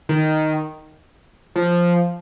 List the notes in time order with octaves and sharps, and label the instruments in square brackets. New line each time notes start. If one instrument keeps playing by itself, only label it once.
[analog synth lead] D#3
F3